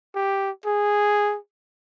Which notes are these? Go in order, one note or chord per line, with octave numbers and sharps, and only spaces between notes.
G4
G#4